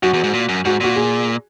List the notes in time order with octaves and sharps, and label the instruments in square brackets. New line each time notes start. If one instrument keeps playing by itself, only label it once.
[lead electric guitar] F#2 [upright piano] F#4
[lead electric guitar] E2
G#2
A#2
F#2
[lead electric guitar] G#2 [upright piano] F#4
[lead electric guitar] A#2 [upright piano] F#4
[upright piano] G#4